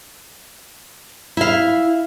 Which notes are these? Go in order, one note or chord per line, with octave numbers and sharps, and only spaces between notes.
E4 F5